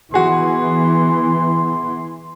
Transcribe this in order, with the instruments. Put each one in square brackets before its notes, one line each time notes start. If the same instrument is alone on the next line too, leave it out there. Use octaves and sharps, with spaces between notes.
[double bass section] E3 [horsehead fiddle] B3 [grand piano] F#4 G#4 [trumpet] C6